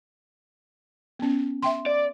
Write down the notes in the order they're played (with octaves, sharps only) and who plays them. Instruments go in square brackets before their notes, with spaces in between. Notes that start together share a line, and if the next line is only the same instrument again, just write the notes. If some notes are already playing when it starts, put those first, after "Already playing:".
[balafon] B3 C#4
E5 G5 C6
[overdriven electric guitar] D5